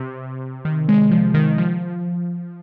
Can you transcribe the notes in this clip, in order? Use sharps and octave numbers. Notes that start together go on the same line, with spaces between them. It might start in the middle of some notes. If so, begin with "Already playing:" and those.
Already playing: C3
D#3
G#3
F3
D#3
F3